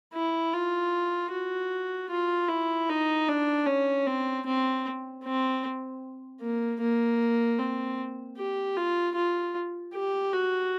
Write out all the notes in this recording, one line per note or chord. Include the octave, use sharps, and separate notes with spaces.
E4
F4
F#4
F4
E4
D#4
D4
C#4
C4
C4
C4
A#3
A#3
C4
G4
F4
F4
G4
F#4